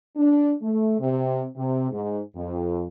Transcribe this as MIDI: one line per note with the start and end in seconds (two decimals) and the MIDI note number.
0.17 0.52 62
0.62 0.98 57
1.00 1.45 48
1.57 1.87 48
1.91 2.20 44
2.36 2.86 41